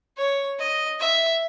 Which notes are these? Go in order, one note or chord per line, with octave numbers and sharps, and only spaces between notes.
C#5
D#5
E5